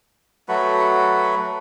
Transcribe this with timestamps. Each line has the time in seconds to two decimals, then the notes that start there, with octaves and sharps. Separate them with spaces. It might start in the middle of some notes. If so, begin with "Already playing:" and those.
0.48 F#3 A3 F#4 B4